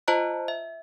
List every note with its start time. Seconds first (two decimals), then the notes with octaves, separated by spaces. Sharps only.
0.08 F4 C5 D#5 A5 A#5 F#6
0.48 E5